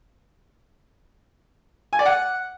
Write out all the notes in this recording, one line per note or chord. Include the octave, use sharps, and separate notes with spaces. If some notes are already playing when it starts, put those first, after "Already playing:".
G#5
D5
F#5